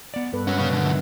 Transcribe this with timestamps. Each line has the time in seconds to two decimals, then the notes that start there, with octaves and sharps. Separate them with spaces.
0.14 B3 D5
0.33 G2 B3 A4 B4
0.47 G#3 C#4 F#4 B4 F#5
0.59 A#2 C#3 F#3 A#3 C#4
0.71 B2 D3
0.86 E5